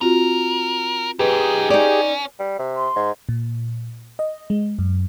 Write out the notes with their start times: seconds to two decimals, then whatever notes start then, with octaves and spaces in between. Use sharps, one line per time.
0.01 C4 F4 F#4 A#4
1.19 F#2 D#4 G4 G#4 B4
1.70 C#4 D#4 D5
2.39 G3
2.59 C3
2.77 C6
2.96 G#2
3.29 A#2
4.19 D#5
4.50 G#3
4.79 F#2